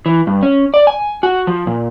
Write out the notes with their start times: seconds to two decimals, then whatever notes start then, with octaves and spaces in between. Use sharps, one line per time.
0.06 E3
0.27 G2
0.43 C#4
0.74 D5
0.87 G#5
1.23 F#4
1.47 F3
1.67 A#2